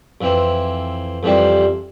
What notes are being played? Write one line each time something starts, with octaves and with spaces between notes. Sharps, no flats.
F2 E3 C4
F2 E3 G3 C4